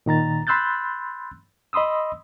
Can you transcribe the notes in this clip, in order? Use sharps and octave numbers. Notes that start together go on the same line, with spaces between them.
A#2 D#3 A#5 A6
B5 C6 E6 F#6 G6 A6
D#5 B5 C6 D#6 E6